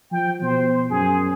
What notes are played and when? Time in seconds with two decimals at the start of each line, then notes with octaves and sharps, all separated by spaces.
0.12 F3 G5
0.42 B2 C5
0.91 F#2 G#4